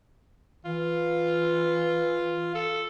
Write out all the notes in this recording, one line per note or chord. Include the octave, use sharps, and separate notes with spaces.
E3 F4
A4